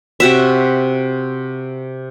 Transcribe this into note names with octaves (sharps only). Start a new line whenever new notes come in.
C3 F#4 E5